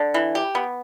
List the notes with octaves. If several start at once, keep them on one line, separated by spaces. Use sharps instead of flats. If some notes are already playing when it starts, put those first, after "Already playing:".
Already playing: D3
E3
G4
B3